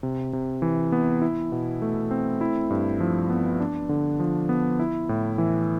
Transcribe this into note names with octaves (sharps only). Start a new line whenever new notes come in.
C3
C3
E3
B3
E4
B2
A3
C4
E4
G2
F3
B3
D4
D3
F3
B3
E4
A2
E3